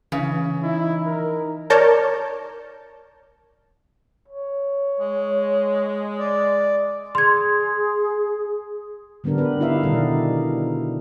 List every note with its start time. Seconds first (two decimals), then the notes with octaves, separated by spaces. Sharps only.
0.12 C#3 E3
0.63 D#4 E4
1.06 A#4
1.70 A#4 C#5 D5 A5 A#5 G6
4.28 C#5
5.00 G#3
6.19 D5
7.15 G#4 C6 G#6
9.24 D3 G3 B3 D4 A#4
9.38 B3 B4
9.60 D#4 E4 G4 E5 F5
9.83 B2 D#3 G3 D4 D#4 A4